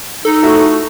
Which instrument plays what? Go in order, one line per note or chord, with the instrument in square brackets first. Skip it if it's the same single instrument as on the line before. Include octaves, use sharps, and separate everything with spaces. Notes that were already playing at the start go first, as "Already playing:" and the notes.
[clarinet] D#4 [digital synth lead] A4
[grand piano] A3 E4 F#4